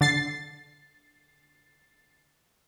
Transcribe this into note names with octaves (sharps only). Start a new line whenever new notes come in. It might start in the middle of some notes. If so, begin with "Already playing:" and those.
D3 A6 C7